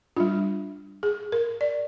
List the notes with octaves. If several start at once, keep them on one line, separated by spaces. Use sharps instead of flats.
G3 D4 F4
G#4
A#4
D5